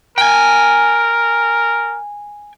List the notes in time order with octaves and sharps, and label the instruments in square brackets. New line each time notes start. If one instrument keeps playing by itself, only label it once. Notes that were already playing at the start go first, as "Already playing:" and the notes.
[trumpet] A#4 [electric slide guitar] G5 G#5